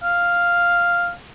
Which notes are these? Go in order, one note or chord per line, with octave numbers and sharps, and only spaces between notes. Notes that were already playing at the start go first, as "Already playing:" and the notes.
F5